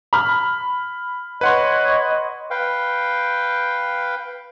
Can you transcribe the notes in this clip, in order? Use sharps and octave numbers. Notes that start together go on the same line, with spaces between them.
B5 F6
B4 C#5 D#5 F#5 C6 C#6 G#6
B4 F5 G5